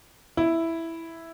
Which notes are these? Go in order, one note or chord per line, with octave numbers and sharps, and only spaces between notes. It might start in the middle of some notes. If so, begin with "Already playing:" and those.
E4